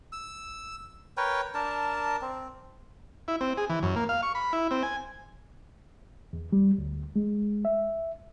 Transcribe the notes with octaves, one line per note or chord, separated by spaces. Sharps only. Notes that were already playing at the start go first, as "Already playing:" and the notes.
E6
A#4 B4 C#5 G5
D4 A#4 A5
C4
E4
C4
G#4
E3
F#2
A#3
F5
C#6
B5
E4
C4
G#5
E2
G3
D2
G#3
E5